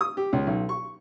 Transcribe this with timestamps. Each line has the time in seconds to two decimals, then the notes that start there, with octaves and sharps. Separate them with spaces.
0.01 D#6
0.17 G4
0.33 C#2
0.47 B1
0.69 C#6